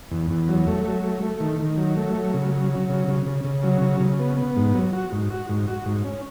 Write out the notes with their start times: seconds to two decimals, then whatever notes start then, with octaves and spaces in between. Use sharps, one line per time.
0.11 E2
0.30 E2
0.49 F#3
0.67 A3
0.85 F#3
1.03 A3
1.22 A3
1.40 D#3
1.59 D#3
1.77 F#3
1.97 A3
2.15 F#3
2.34 C#3
2.52 F#3
2.70 F#3
2.89 C#3
3.08 C#3
3.26 C#3
3.45 C#3
3.64 F#3
3.81 C#3
4.00 C#3
4.19 B3
4.37 B3
4.56 G#2
4.74 F#3
4.93 F#4
5.12 G#2
5.30 F#4
5.49 G#2
5.67 F#4
5.86 G#2
6.04 C#4